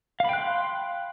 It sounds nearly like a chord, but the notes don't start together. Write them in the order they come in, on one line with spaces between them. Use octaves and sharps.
F5 B5 G5 F#6 C6